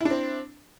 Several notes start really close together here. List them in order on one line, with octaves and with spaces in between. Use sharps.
E4 D4 C4